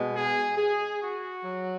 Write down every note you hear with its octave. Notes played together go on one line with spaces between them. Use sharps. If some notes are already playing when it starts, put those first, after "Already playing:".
Already playing: B2 G#3
G#4
G#4
F#4
F#3